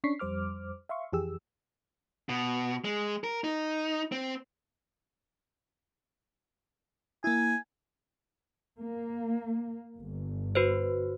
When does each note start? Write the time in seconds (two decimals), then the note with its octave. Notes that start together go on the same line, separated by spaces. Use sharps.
0.04 C#4 D4 C#6 B6 C7
0.19 F2 G3 C5 D6 F6
0.89 E5 F5 C6 C#6
1.13 F2 E3 G4 G#4 E6
2.29 B2
2.84 G#3
3.24 A#4
3.44 D#4
4.12 C4
7.24 A#3 E4 G#5
8.79 A#3
9.99 G1
10.55 F#4 B4 C5